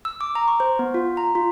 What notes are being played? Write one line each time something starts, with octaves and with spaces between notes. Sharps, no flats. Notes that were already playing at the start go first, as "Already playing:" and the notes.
E6
D6
A#5
C#6
C5
B3
F4
A#5
F4